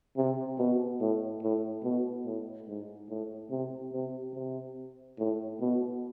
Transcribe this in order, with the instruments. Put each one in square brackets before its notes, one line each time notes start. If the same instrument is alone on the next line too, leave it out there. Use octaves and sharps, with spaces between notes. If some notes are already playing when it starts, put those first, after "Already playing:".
[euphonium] C3
B2
A2
A2
B2
A2
G#2
A2
C3
C3
C3
A2
B2